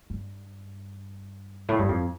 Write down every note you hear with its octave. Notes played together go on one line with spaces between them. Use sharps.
G2
A2
G2
F2